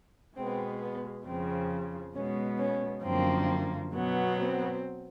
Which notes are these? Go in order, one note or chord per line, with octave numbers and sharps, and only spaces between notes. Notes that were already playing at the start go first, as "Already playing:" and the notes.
B2 G#3 B3 C4
B3
F2 C#3 F3 C4
B2 G#3 B3 C#4
C#4
F#2 D3 F3 A#3 C4
B2 F#3 B3
C4